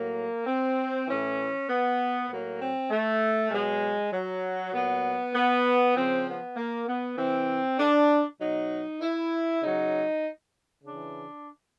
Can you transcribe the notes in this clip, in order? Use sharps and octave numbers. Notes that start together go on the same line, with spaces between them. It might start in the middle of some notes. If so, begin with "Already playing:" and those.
Already playing: A2 F#3 A#3
C4
A2 E3 C#4
B3
A2 F#3 A#3
C4
A3
B2 F#3 G#3
F#3
A#2 F#3 B3
B3
C#3 F3 C4
B3
A#3
B3
C3 E3 C4
D4
B2 F#3 D#4
E4
C#3 F#3 D#4
C#3 E3 D4